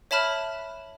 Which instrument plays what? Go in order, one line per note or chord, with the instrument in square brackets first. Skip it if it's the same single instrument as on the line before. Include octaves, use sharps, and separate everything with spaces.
[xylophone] C#5 E5 A5 B5 F6 F#6